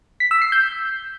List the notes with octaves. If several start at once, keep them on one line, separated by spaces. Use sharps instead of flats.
B6
E6
C7
G6